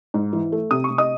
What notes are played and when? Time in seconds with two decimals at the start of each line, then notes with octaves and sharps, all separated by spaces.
0.14 G#2
0.33 E3
0.52 A3
0.71 C3 D#6
0.84 C#6
0.90 C3
0.98 D#5 D#6